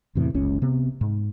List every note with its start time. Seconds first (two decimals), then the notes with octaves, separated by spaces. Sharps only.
0.15 E2 A2 C3 E3
0.34 F#1 C#2 C#4
0.62 C3 B3
1.01 G#2